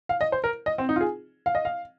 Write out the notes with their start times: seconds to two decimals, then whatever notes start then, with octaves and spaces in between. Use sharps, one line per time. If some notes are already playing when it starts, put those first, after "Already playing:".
0.09 F5
0.21 D#5
0.32 C5
0.44 A#4
0.66 D#5
0.78 C4
0.89 D#4
0.96 F4
1.01 G#4
1.46 F5
1.55 D#5
1.65 F5